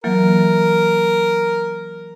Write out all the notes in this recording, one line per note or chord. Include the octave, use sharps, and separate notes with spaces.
E3 F#3 A#3 A#4